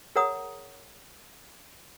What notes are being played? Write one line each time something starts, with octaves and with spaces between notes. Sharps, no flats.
G#4 A#4 C#5 F#5 A#5 D#6